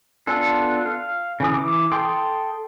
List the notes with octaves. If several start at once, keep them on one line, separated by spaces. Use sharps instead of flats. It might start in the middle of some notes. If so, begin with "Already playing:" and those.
B3 D4 F4 A4
F5
C#3 E3 D#6
E3 D6
A4 G5 C6 D#6